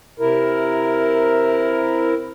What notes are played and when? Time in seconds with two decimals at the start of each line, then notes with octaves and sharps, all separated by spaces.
0.20 C3 E4 A#4